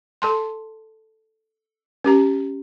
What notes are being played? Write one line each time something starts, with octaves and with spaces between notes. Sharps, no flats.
A4 A5 C6
C#4 G4 A#5